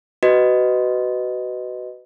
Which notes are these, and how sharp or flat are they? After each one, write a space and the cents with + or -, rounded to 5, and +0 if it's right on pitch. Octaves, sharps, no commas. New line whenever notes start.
F#4 +20 B4 +15 D#5 +0